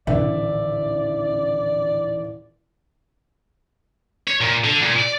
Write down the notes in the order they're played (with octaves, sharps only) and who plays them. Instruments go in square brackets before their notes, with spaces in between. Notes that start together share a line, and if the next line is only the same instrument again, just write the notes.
[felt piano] D#1 A1 E5 [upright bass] D3 [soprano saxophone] D5
[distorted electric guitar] C#5
A#2
D3
A#2
D5